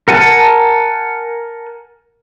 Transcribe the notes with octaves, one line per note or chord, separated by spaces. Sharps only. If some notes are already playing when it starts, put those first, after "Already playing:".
A#4 F#5 G#5 A5